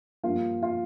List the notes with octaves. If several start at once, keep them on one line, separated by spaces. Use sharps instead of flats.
G2 F3 A#3 F4
F4